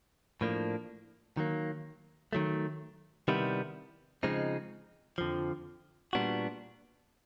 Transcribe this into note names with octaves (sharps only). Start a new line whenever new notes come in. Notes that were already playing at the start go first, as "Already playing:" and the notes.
A2 F3 A#3 D4
D#3 F#3 A#3
D#3 F#3 A3
C3 D#3 G3 B3 E4
C#3 F3 G#3 C4 D#4
F2 D3 F3
A#2 G3 B3 D4 F#4